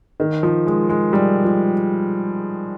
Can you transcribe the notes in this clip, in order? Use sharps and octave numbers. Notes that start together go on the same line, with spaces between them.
D#3
F3
G#3
G#3
G3
F3